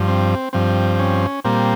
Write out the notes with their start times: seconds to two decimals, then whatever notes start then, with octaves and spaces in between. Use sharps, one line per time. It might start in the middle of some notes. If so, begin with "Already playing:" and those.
Already playing: G2 F3
0.08 C4
0.53 G2 F3 C4
0.99 C#4
1.44 A#2 G3 A#3 C4